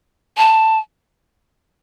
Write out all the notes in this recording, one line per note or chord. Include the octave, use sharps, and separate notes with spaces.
A5